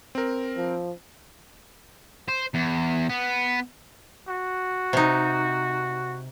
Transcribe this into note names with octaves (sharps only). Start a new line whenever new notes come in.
C4 A#4
F3
C5
E2
B3
F#4
C3 D#4